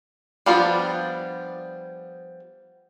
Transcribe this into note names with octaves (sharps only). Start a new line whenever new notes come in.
F3 G3 B3 D4 F4